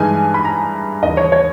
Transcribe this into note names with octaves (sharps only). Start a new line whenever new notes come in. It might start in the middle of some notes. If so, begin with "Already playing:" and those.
Already playing: G2 E3 G#3 D#4 G#5
B5
A#5
D#2 C#3 E3 D#5
C#5
C#5